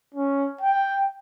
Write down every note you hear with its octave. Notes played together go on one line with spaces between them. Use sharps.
C#4
G5